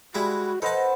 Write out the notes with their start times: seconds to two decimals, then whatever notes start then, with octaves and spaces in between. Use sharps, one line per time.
0.15 G3 G#3 E4 F#4
0.62 A4 B4 C5 D#5 F#5 A5